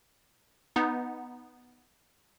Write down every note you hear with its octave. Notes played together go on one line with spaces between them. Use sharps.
B3 D#4